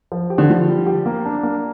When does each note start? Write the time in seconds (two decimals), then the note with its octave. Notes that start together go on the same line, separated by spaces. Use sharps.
0.12 F3
0.30 G4
0.38 D3
0.49 F3 G3
0.69 G3
0.87 G4
1.06 A#3
1.25 D4
1.43 A#3